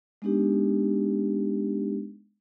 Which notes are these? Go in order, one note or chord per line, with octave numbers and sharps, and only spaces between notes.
G#3 B3 D4 D#4 G4